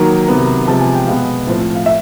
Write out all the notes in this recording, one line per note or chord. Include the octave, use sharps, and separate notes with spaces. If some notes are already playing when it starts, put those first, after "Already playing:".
Already playing: D#3 F#3 A#3 A#5
C3 D#3 F#3 B3
C3 F3 G#3 B3 A5
G#5
G5
B2 G#3 B3 F5
A2 F3 A3 C4
F5
E5